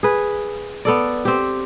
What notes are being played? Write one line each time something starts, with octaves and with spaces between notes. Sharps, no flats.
G#4 B4
B3 A4 D5
C4 G4